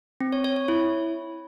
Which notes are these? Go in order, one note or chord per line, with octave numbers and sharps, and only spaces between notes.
C4
C#5
C#5
C#5
E4